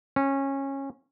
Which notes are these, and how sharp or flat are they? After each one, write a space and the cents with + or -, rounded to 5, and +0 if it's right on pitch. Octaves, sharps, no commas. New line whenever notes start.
C#4 -20